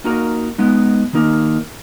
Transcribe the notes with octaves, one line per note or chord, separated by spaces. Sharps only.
A#3 D#4 F#4 A#4
G#3 B3 D#4
D#3 A#3 D#4 A#4